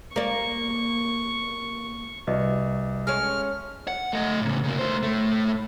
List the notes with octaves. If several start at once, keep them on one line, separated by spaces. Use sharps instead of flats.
A#3 D5 C#6
C2 F#4 B4 D5 D#5
G#3 A3 C#4 F6
F#5
A3 D#5
A2 C#3
C#3 A#3
A3 C5
A2 A3